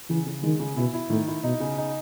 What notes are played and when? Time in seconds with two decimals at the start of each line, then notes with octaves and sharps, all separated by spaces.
0.10 C#3 E3
0.26 C#3
0.43 D#3 G#3
0.59 C#3
0.77 B2 E4
0.94 E4
1.10 A2 D#3
1.28 E4
1.44 B2 D#4
1.60 C#3
1.78 D#4